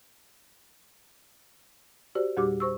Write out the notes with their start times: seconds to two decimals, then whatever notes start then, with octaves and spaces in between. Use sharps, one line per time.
2.15 F#4 G4 C5 D5
2.37 E2 A#2 G3 F#4 G4 D6
2.60 C5 C#6 E6